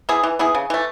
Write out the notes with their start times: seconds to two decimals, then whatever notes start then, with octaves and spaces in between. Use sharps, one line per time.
0.09 B3 E4 G#4
0.23 E3
0.39 B3 E4 G#4
0.55 C#3
0.70 E3 A3